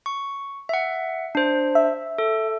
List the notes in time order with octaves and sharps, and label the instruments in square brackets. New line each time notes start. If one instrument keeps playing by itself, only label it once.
[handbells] C#6
E5 F#5
D4 C5
[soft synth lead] E5
[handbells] A4